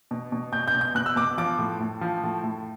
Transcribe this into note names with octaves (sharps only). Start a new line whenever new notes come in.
B2
B2
B2 G6
G6
B2
G6
B2 F#6
E6
B2 D6
F3 D6
A2
A2
F3
A2
A2